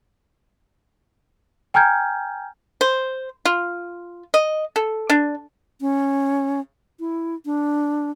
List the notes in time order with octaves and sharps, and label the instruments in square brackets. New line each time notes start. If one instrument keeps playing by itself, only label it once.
[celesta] G5 G#5 A#5 F6 G6 G#6
[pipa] C5
F4
D#5
A4
D4
[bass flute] C#4
E4
D4